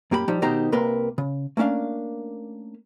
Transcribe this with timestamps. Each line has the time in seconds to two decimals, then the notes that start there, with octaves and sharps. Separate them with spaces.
0.11 F#2 A#3 G4 A#4 B5
0.28 F3 G3 D#4 G4
0.42 B2 D#3 D#4 G4 C5 A#5
0.72 C2 C3 A#3 A#4 B4 C6
1.18 C#3
1.57 A3 A#3 C#4 D4 F5